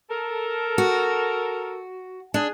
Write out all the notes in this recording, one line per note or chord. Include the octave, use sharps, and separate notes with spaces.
A4 A#4
F#4
D4 G#4